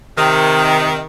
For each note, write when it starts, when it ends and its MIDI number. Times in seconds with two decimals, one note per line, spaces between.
0.17 1.01 48
0.17 1.01 51